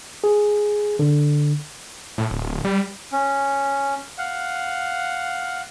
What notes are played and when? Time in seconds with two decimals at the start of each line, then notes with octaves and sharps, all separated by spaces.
0.24 G#4
0.99 D3
2.18 A2
2.31 D1
2.44 D1
2.64 G3
3.12 C#4
4.18 F5 F#5